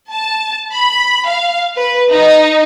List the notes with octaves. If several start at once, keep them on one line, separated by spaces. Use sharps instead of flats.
A5
B5
F5
B4
D#4